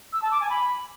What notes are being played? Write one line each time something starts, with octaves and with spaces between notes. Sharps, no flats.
E6
A5
D6
G#5
B5